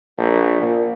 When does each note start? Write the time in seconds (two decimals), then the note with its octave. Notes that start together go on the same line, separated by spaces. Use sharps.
0.18 A#1
0.62 A#2